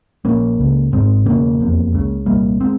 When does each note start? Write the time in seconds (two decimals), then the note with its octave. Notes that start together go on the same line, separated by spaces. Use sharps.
0.25 A#1 A#2 A#3 C#4
0.59 C#2 C#3
0.92 G#1 G#2 G#3 C4
1.26 E1 E2 C#3 A#3 C#4
1.60 F1 E2 C3
1.93 C#2 C#3
2.26 C2 A#2 G3 A#3
2.61 G#3 C4